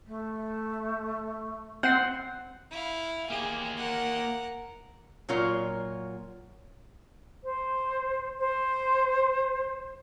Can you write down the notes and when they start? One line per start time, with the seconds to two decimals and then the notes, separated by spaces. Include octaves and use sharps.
0.06 A3
1.83 C4 F#5 G6 C7
2.71 E4 F5
3.30 A#3 G4 G#4
3.78 A#4 F#5
5.29 A#2 F#3 F4 A#4 C#5
7.43 C5
8.39 C5